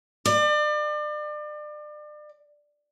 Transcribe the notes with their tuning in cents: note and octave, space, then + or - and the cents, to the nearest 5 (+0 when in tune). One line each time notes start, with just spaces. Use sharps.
D5 +35